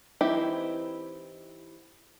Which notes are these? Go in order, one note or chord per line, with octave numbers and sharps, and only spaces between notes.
E3 C4 D#4 E4 G4